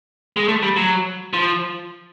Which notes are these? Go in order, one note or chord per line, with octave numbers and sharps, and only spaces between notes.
G#3
A3
G3
F#3
F3